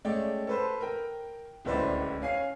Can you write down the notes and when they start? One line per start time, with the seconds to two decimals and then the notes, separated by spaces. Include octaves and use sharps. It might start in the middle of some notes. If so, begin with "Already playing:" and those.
0.05 G#3 A3 C#4 D5 G5
0.47 A4 B4 C5
0.81 A#4 G5
1.65 D1 C#2 E4 B4 C5 D5
2.22 C#4 F5 G#5 C7